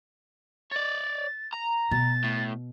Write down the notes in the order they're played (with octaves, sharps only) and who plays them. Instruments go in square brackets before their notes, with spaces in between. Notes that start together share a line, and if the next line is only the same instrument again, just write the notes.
[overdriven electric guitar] C#5 D5 [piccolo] A6
[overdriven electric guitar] A#5
[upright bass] B2 [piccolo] A6
[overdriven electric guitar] A2